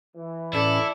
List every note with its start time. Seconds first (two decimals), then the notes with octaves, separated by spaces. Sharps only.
0.16 E3
0.53 A2 C#4 E4 A4 D5